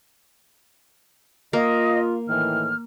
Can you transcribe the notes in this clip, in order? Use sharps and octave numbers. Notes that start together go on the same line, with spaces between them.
A#3 F4 D#5
A2 D#3 E3 F6